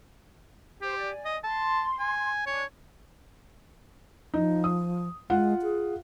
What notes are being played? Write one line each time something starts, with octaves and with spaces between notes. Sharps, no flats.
G4 C5
D5 G#5
D#5
A5 C6
G#5
D4 C#5 G#5
F3 D#4
D#6
G#3 F4 F5 F#5
G#4